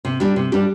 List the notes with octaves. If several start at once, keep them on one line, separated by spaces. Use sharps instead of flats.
C3
G3 D4 G4
C3
G3 D4 G4